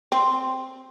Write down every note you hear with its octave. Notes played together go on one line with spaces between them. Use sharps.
C4